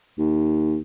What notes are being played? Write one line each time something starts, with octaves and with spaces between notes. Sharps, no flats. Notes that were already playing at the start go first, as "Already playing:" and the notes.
D#2